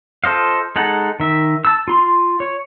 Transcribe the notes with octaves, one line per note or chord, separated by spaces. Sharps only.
F4 A4 C5 D#5 F5
G#3 D#4 A4 F#5
D#3 E5
A5 E6
F4 C6
C#5